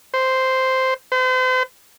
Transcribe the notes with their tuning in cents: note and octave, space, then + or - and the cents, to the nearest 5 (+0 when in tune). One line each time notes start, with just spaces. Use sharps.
C5 -5
C5 -40